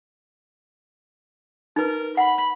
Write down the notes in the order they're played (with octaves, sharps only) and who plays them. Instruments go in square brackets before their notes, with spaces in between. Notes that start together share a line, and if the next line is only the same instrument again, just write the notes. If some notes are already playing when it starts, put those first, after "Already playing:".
[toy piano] D#4 B4 [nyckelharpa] A#4
[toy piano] F#5 [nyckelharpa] B5